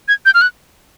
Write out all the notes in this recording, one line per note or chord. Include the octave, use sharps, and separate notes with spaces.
G#6
G6
F6
F#6